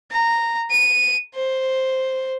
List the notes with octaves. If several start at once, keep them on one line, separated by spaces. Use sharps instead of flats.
A#5
D#7
C5